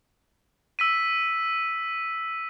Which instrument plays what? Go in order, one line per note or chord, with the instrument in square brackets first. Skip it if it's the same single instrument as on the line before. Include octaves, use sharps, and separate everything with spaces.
[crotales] E6 B6 D#7